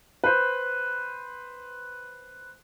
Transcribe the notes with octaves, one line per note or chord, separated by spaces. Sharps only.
B4 C5